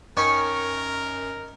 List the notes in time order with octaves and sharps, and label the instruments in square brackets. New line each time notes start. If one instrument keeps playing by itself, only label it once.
[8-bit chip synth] F#2 [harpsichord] D#3 C#4 [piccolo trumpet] A#4 [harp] C#6 C#7